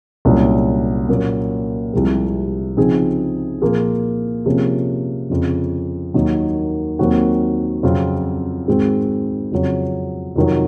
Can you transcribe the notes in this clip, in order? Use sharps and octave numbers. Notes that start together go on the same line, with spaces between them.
C2 A#2 F#3 C#4
A#2 F#3 A#3 C#4
C2 C3 F3 G#3 C4
C#3 F3 C4 D#4 G#4
A#2 F3 A#3 F4 G#4
C3 F3 A#3 C#4 G#4
F2 C#3 F3
D#2 D#3 F#3 A#3 D#4
D#2 D#3 F#3 C4 F#4
F2 C#3 F#3 C4 F4
G#2 D#3 G#3 C4 F#4
F2 C#3 F#3 C#4
F2 C3 D#3 F#3